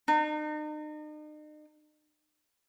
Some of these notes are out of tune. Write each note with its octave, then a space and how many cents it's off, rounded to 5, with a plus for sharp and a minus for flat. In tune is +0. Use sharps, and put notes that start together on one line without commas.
D#4 -40